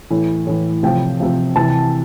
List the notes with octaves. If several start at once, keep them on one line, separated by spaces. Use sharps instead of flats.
A2 E3
A2 E3
C3 F3 G5
C3 F3
C3 E3 A5